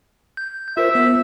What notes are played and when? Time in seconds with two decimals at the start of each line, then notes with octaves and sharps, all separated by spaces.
0.37 G6
0.77 F4 A#4 C5 E5
0.95 B3